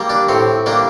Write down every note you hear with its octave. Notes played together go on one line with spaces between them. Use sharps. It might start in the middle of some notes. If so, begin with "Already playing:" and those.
Already playing: G3 A#3
D4
A2 C4
G3 A#3 D4